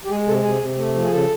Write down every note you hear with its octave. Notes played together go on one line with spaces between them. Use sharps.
G4
G#3 G#4
C3 A4
C3 G#4
C3
A3
F3
G#4
C#3 A4